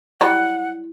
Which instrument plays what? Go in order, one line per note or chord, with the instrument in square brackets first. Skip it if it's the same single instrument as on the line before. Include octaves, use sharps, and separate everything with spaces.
[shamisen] F#3 G3 [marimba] E4 [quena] F#5